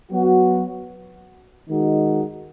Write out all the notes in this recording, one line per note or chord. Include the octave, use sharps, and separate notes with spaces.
F#3 B3 F#4
D#3 G#3 D#4 F#4